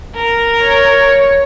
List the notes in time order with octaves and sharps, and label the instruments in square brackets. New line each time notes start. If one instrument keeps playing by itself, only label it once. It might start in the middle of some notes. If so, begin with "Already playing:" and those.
[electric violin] A#4
[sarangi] C#5